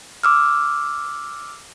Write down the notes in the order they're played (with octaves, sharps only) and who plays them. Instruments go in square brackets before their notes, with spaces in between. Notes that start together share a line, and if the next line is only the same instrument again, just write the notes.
[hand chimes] D6 E6 F6